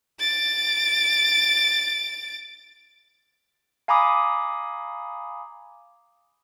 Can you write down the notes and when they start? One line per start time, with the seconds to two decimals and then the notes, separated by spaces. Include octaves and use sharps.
0.20 A6 D7
3.88 F5 G#5 A#5 B5 D6 D#6